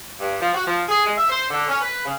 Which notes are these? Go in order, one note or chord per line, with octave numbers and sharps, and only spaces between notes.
G2
F3
F#4
F3
G#4
G#3
E5
C5
D3
C#4
B4
C#3